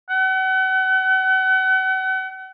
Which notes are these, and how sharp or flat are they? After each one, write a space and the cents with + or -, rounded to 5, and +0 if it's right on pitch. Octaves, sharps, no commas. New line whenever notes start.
F#5 +35